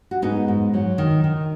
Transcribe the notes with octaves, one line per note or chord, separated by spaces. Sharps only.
F#4
G#2 B3 D#4
G#2
F#3
D#3
D#3